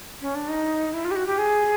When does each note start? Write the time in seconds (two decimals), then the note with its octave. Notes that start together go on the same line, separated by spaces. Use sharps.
0.21 C#4
0.35 D4
0.49 D#4
0.93 E4
1.05 F4
1.11 G4
1.16 F#4
1.27 G4
1.38 G#4